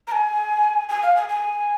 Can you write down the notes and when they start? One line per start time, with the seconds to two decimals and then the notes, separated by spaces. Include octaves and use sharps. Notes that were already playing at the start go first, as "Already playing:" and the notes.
0.07 A#5
0.12 G#5
0.89 G#5
1.03 F5
1.16 G#5
1.29 G#5